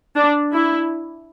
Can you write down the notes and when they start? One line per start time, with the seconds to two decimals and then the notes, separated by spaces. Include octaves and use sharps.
0.16 D4
0.53 E4